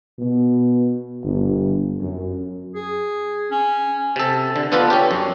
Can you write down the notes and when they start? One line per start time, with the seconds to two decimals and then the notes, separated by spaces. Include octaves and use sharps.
0.19 B2
1.23 G1
2.00 F#2
2.75 G#4
3.51 C#4
4.16 C3 A4
4.56 D3
4.72 B3 D4 F4 A4 B4
4.90 C#4 G4
5.11 F#2